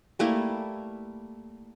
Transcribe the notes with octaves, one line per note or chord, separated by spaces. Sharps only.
G3 A3 A#3 E4